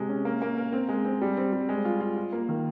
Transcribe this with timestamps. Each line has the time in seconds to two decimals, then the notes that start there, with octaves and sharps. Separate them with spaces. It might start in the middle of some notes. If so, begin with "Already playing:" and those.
Already playing: C3 G#3 G4
0.09 C#4
0.25 A#3
0.42 A#3
0.57 A#4
0.73 C4
0.89 G#3
1.05 C4
1.21 G3
1.37 C4
1.53 G3
1.69 G#3
1.85 F4
2.01 F4
2.17 F4
2.33 A#3
2.49 D#3